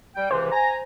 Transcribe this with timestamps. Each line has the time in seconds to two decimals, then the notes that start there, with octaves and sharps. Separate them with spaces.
0.15 G3 G5
0.31 C#2 C3 E3 C5
0.51 G#5 A#5